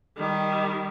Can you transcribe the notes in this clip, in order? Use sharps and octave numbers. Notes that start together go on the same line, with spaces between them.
D#3 G3